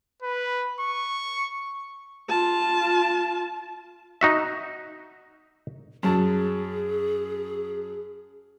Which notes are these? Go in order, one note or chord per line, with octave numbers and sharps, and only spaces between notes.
B4
C#6
F4 A5
D#4 F#4 E5
F#2 F#3 G#4 A5